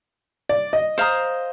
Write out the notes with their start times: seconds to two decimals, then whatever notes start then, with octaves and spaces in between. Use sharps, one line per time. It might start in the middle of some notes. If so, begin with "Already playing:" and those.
0.49 D5
0.73 D#5
0.98 C5 F5 A#5 D#6